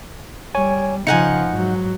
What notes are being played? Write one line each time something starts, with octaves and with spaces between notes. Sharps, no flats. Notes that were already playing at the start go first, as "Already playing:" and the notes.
G3 C#5 G#5
C#3 F3 D#4 F#5 G#5 C#7
G#2 F#3